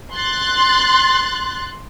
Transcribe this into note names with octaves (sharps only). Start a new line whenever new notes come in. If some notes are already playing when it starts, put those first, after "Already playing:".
C6 F#6 A6